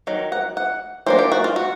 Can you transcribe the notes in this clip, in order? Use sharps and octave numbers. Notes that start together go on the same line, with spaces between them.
D#3 F#3
F#5
F#5
F#3 A#3 D4 C5
G4
F#4
F4
F#4